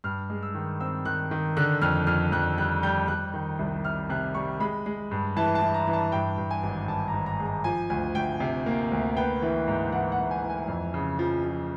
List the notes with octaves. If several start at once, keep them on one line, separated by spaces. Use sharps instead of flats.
G2 F6
G#3
E6
D#3
C4 E6
D#3 F#6
D#3
D3 F#6
F2 F6
F2 F6
F2 F#6
G3 F#6
G3 G6
G3 F#6
D#3
C2
C3 F6
C3 F#6
G3 C#6
G#3 B5
G#3
G2
E3 A5
A5
E3
A#5
E3
A5
G2 G5
G2
G#5
G#1
G2 A5
A#5
G#1
A#5
G#3
A#5
F3 G#5
D2 G#5
D2 G5
C3
A#3
D2
B3 G5
E3
G#2
E3 F#5
F#5
G#2
G#5
E3
G#5
F2
C#3
F3
F3